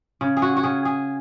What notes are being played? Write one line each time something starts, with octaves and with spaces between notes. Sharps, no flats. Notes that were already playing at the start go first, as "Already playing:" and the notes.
C#3
G#4
F#4
F#4
C#3 G#4
G#4